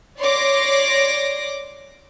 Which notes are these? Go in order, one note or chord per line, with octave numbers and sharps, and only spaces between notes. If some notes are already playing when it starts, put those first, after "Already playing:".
C#5 D5 C6 D6 A#6